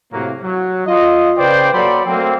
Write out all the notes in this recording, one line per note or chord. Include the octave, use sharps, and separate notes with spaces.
A2 C3 F#3 A#3
F#3
F4 D#5
C#3 B4 C5 D5 G5
F#3 A#3 A4 D5 B5 C6
F#3 A3 A#3 C4